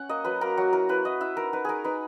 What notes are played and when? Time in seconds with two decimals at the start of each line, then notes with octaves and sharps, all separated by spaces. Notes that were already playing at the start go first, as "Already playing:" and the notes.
Already playing: C#4 F#5
0.09 A#3 D#5
0.25 F#3 B4
0.41 A#3 A#4
0.57 F#3 F#4
0.73 E4 A#4
0.89 E4 B4
1.05 E4 D#5
1.21 E4 E5
1.37 D#4 A#4
1.53 D#4 B4
1.65 D#4 G#4 A#4
1.84 D#4 B4